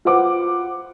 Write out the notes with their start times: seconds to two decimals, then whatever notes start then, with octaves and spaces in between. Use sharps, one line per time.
0.05 F4 B4 C5 F#5 D6